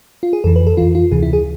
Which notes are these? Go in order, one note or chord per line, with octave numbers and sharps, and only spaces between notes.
F4
G#4
F2 E3 A4
B4
A4
F2 E3 F4
F4
D2 C3 E3 G#4
E4
G#4